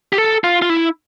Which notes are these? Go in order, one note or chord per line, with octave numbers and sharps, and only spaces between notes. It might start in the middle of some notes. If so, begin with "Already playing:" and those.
G4
A4
F4
F4
E4